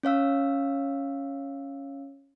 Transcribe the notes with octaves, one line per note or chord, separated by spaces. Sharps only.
C#4 C#5 F5 E6